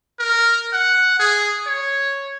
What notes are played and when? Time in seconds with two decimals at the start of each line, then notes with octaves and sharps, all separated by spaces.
0.19 A#4
0.73 F#5
1.19 G#4
1.67 C#5